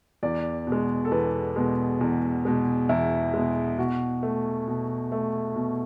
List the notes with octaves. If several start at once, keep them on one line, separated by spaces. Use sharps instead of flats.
E2 D5
B2
G#3
A4
E2 B4
B2 G#3
E2
B2 G#3
E2 E4
B2 G#3
B2 F#4
A3
B2
A3
B2